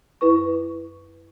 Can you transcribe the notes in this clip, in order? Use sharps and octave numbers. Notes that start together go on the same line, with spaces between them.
F#2 E4 B4 C#6